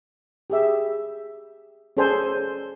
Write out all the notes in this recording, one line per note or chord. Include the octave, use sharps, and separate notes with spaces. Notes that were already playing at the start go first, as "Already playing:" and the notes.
G4 G#4 E5
C#4 G#4 A4 C5 D5 G#5